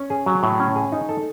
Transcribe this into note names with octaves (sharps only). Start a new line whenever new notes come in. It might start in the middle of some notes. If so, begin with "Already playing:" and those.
Already playing: C#4
G#4
F#3
A2
C#4
G#4
D#4
A4